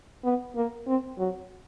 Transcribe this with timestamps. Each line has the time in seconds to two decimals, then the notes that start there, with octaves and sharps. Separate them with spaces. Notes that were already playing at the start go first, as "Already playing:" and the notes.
0.24 B3
0.56 A#3
0.88 C4
1.19 F#3